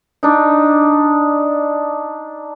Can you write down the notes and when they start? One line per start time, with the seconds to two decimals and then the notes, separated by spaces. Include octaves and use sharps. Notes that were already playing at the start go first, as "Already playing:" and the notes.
0.23 D4 D#4